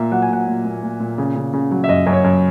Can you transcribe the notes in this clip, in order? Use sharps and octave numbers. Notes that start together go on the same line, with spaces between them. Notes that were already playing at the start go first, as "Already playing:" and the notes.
Already playing: A#2 A#3 E5
F#3 F#5
G#5
A#2 F#5
A#2
A#2
A#2
A#2
C#3
C#3
C#3
F#3
E5
F#2 D#5
F#2
C#5
F#2